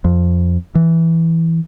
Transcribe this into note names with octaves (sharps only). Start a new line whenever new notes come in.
F2
E3